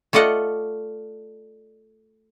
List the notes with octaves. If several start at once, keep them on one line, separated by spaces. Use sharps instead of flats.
A3 F4 D5 D#5 F#5